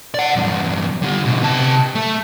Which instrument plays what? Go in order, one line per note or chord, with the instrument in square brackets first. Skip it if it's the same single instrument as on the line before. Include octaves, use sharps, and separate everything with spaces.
[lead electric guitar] D5 F#5
E2 G2
D3 G3
B2 D3
C3 A5
A3